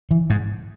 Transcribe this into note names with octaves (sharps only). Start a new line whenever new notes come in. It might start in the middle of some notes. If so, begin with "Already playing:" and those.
E3
G#2